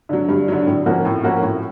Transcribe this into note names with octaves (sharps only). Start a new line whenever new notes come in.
D3 F#3
G2
D3 F#3
A2
F3 A#3 C#4 F#4
A2
F3 A#3 C#4 F#4
A2